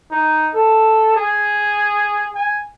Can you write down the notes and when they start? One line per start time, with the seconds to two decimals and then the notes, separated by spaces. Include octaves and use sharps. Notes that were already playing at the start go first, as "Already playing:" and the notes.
0.11 D#4
0.54 A4
1.16 G#4
2.35 G#5